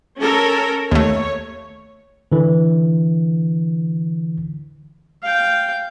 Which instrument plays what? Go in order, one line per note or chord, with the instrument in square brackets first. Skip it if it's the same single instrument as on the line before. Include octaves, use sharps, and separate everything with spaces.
[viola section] C#4 A4 A#4
[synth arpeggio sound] D#2 A3 [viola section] C#5
[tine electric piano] D3 E3
[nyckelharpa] F5 G5